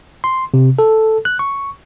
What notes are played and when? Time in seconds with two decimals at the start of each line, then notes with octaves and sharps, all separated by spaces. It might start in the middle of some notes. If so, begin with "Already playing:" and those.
0.24 C6
0.54 C3
0.79 A4
1.25 F#6
1.39 C#6